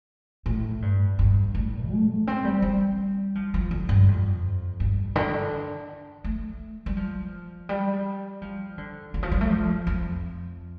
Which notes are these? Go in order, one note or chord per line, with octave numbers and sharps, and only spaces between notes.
A2
G2
G2
A2
A3
C4
G3
G3
F3
F3
D3
G2
F2
G2
D3
A3
G3
F3
G3
F3
D3
D3
F3
G3
A3
F3
F2